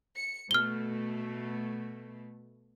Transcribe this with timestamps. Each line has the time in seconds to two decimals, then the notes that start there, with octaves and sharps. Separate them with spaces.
0.15 C#7
0.51 B2 A3 F6 G7